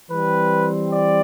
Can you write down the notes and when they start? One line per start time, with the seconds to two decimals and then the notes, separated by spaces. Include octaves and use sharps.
0.10 E3 G3 C4 B4
0.92 D5